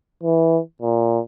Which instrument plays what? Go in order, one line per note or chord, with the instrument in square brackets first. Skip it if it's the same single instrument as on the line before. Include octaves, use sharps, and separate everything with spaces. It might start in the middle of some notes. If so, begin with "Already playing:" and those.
[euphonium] E3
A#2